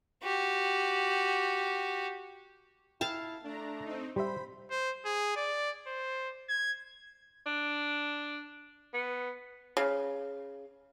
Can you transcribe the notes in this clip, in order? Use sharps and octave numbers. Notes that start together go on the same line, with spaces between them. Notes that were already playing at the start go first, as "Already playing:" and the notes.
F#4 G4
E4 F5 G5 A5
A3 D4 A#5
C4 D#4
G3 C5 E5 B5
C5
G#4
D5
C5
G#6
D4
B3
C#3